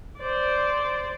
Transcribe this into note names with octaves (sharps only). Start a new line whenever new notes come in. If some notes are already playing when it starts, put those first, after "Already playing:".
C5 D5